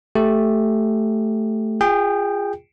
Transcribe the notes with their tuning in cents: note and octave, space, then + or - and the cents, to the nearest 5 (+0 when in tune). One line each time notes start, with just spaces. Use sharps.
A3 +0 G4 +0
F4 +0 G#4 -25 G5 +0